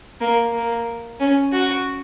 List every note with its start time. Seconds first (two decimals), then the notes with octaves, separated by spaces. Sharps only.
0.21 A#3
0.53 A#3
1.20 C#4
1.53 F#4